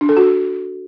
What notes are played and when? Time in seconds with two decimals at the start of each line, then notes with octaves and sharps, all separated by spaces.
0.01 D4
0.09 A4
0.17 F#4